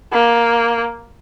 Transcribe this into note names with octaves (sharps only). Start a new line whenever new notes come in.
A#3